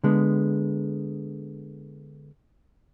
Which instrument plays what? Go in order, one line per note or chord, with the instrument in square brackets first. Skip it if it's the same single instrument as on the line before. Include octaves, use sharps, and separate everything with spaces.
[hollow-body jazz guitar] D3 G#3 B3